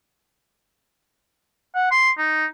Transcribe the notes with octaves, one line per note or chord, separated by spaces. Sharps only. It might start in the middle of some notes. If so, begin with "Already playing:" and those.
F#5
C6
D#4